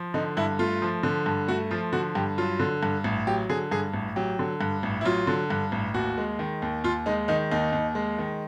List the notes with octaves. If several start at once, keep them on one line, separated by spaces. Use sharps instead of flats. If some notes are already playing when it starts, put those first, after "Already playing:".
Already playing: F3
D3 D#4
G2 E4
A3 F4
F3
D3
G2
A3 F#4
F3 F4
D3 F#4
G2 G4
F#3 F4
D3
G2
A1
F#3 G4
D3 G#4
G2 G#4
A1
F#3 G4
D3
G2
A1
E4
F#3 F4
D3
G2
A1
D#2 F#4
G#3
D#3
D#2
D#2 F4
G#3 D#4
D#3 D#4
D#2 D#4
D#2
G#3
D#3